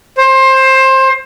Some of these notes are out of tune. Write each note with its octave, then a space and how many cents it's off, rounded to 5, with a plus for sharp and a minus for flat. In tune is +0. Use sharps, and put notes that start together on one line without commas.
C5 +20